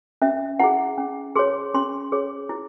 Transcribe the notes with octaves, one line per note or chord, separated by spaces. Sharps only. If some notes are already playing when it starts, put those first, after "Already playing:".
C#4 E5
E4 G#4 F#5
C#4
G#4 C#5 C6
C#4 C6
G#4 C#5
E4